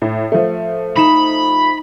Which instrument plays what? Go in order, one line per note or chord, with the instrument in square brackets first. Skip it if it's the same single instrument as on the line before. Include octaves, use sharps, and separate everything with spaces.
[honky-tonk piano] A2
F3 A3
[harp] D#4 E7 [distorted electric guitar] B5